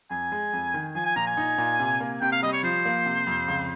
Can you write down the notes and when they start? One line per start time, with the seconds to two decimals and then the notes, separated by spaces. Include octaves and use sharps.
0.10 F2 G#5
0.32 G#3
0.53 F2
0.74 D#3
0.95 F3 G#5
1.05 G#5
1.16 A#2 A#5
1.27 G#5
1.37 D#4
1.58 A#2
1.79 C3
2.00 A#3
2.21 C3 G5
2.32 F5
2.42 G3 D#5
2.53 C#5
2.63 F3 C5
2.85 A#3
3.06 C3
3.27 F2
3.48 C#2